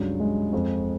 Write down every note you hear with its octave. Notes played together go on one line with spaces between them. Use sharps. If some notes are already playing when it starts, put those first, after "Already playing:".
Already playing: C#2 G2 F#3
G#3
F2